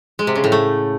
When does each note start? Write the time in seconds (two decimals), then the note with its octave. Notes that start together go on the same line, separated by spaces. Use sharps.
0.19 G#3
0.27 C3
0.35 C#3
0.44 A2
0.52 A3